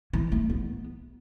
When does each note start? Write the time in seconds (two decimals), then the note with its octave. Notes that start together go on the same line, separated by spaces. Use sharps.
0.13 E3
0.32 A3
0.50 B3